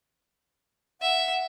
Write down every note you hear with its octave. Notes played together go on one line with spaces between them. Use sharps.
E5 F#5